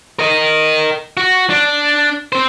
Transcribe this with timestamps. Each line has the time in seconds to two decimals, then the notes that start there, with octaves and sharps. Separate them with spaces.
0.19 A#4 D#5
1.17 F#4
1.50 D4
2.32 C4 C5